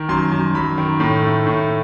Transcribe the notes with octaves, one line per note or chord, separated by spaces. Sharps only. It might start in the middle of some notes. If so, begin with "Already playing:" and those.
Already playing: D#3
F#2 C6
F#2
F#2 B5
D#3
A2
A3
A2